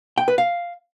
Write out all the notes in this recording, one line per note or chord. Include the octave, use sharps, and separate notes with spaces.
G5
B4
F5